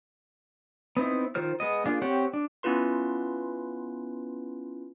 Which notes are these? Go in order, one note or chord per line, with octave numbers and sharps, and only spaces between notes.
B3 C4 D#4 E4
D#3 F4 C5 F6
G#3 B3 D#5
A#3 D4 F4 G#4
C4 G4 C#5 F#5 G5
D4
B3 C#4 E4 F4 B4 C6